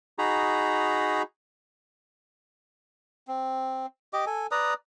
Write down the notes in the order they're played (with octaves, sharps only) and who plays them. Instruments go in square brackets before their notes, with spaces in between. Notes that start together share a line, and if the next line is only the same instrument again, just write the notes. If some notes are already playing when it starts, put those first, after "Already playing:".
[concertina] D#4 F#4 G#4 A#5 B5
[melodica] C4
G4 D#5 D6
A4 G#5
B4 D5 A#5 D#6